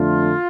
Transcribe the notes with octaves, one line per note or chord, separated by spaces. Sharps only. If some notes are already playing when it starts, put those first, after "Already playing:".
Already playing: F2 D3 A3 D4 F4